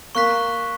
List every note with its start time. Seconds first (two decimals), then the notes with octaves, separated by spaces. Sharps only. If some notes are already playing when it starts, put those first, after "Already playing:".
0.15 A#3 C#6 F#6 B6